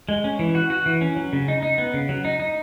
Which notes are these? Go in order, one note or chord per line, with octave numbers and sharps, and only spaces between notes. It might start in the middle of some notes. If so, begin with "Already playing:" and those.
G#3
C#4
E3
F#4
F#4
E3
C#4
F#3
C#3
D#4
D#4
B3
C#3
F#3
D#4
D#4